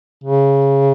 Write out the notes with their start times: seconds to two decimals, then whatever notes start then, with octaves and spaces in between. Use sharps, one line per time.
0.24 C#3